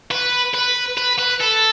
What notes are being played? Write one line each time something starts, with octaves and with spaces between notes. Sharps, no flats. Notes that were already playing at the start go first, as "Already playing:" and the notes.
B4
B4
B4
B4
A4